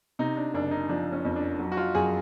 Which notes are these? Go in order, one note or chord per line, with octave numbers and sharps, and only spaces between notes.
C3 D#4
D4
F#1 D4
D#4
F3 D4
C#4
F2
D4
F#3
F#4
F4
F#2 G#4